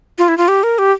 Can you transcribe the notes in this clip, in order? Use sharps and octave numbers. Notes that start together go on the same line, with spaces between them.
F4
E4
F4
G4
A#4
G4